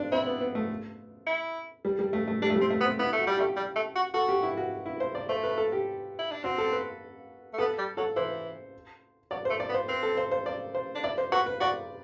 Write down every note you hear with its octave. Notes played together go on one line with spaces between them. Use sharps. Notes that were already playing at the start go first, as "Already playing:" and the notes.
Already playing: C4 D4
C4 E4
B3
B3
A3
E4
G3
G3
A3
A3
G3 D4
A3
G3 C4
A3
B3
C4
B3 E4
A3
F#4
G3
A3 G4
G3
A3
F#4
F#4 A4
G4
E4
F#4
E4
C5
D5
A3 C5
B4
A4
G4
E4
D4
C4 F#4
A4
B4
A3
B3 A4
G3
F#3 A4
E3 C5
F#3 D5
A3 C5
D5
B3
C5
C4 B4
A4
C5
C5
D5
C5
D4
E4 D5
C5
F#4 B4
B4
F#4 D5